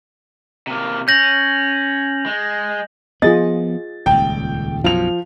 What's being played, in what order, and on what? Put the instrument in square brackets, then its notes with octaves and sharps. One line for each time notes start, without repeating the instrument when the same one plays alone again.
[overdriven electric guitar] C3 A#3
[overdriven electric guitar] C#4 [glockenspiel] G6 A#6 F#7
[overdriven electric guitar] G#3
[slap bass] F3 B3 [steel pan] F4 G#4 D#5 [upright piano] A6
[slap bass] D#1 C#2 [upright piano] G5
[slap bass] B1 F#2 [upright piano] F3 F7 [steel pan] F5